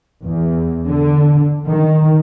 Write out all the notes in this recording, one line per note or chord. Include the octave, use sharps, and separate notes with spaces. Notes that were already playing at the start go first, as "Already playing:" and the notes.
E2
D3
D#3